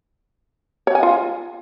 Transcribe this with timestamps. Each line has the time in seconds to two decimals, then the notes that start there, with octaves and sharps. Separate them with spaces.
0.87 C#5
0.95 G#5
1.03 F4